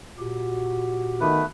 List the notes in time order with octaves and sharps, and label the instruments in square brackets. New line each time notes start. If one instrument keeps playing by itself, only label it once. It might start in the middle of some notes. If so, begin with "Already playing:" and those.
[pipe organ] A#2 G4 [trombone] F#4
[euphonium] D#3 [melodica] A3 B3 B4